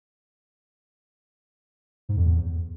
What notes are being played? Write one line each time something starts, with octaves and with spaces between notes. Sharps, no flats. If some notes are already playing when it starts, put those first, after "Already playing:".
G#2
F2
E2